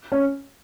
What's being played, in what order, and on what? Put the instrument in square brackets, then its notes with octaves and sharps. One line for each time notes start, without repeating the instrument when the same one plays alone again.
[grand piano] C#4